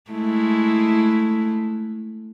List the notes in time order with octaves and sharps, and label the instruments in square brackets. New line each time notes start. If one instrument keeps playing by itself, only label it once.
[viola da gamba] G#3 A3 E4